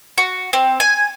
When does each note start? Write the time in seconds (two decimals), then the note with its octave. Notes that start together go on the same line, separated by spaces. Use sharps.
0.18 F#4
0.53 C4
0.80 G#5